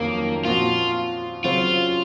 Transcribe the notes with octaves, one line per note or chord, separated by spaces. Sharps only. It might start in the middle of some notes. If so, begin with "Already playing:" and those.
Already playing: F2 D#3 F#3 A#3 C#4
A#2 F3 C4 F4 F#4
C#3 F#3 C4 F4 F#4 C5